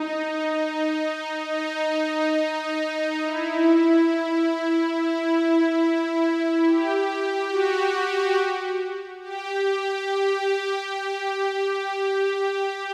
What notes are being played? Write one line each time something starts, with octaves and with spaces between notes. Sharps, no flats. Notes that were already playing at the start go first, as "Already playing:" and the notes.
Already playing: D#4
D#4
E4
E4
G4
F#4
G4